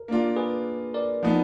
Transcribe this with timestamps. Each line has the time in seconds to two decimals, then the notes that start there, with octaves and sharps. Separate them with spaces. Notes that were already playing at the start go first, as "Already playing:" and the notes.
Already playing: A#4
0.08 A#3 D4 F4
0.36 G#4 B4
0.94 A#4 D5
1.23 F3 B3 D#4